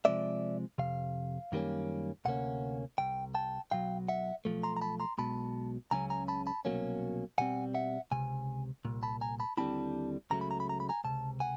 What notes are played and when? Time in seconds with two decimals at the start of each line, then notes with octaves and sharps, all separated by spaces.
0.05 C3 F3 G#3 C4 D5 E5
0.78 F2 C3 F5
1.52 F#2 D#3 G3 A#3 C#4
2.25 D2 C3 A#3 C#4 F#5
2.98 C2 C3 G5
3.35 G5 A5
3.71 B1 B2 F#3 F5 G5
4.08 E5 F#5
4.45 B1 A#2 F3 A3
4.63 A#5 C6
4.77 A#5
4.81 A5 B5
5.00 A#5 C6
5.18 B1 B2 G#3 A5 B5
5.91 C#2 C#3 F#3 C#4 G#5 A#5
6.10 G#5 A#5
6.28 A5 B5
6.47 A5 B5
6.65 C2 B2 F#3 A#3 C#4
7.38 B2 G3 C4 F#5 G#5
7.74 E5 F#5
8.11 C#2 C3 G#5
8.85 C2 A#2
9.03 A5 B5
9.21 G#5 A#5
9.40 A5 B5
9.57 D#2 D3 G3 C4 E4 A5 B5
10.30 C#2 C#3 F#3 A3 A#5
10.41 B5
10.51 A#5
10.60 B5
10.69 A#5
10.80 B5
10.89 G#5 A#5
11.04 C#2 C3 A5
11.40 F#5 G#5